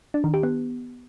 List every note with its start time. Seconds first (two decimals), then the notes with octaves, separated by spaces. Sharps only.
0.14 D4
0.24 D#3
0.34 G4
0.43 B3